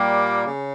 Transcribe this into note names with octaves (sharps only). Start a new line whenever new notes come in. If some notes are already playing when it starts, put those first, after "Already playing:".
Already playing: A#2 G3 A#3
C#3